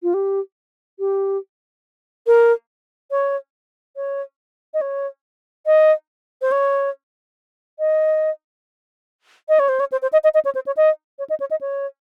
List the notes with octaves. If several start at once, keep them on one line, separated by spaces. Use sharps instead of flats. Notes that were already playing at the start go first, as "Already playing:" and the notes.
F4
G4
G4
A#4
C#5
C#5
D#5
C#5
D#5
C5
C#5
D#5
D#5
C#5
C5
C#5
C5
C5
D#5
D#5
D#5
C#5
C5
C#5
D#5
C#5
D#5
C#5
D#5
C#5